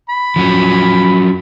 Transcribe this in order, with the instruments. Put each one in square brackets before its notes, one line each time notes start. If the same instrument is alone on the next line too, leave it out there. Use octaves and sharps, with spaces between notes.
[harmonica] B5
[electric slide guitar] F3 F#3 C#4